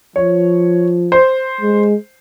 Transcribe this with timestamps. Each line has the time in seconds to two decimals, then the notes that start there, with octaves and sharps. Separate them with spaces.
0.16 F3 C#5
1.12 C5
1.61 G#3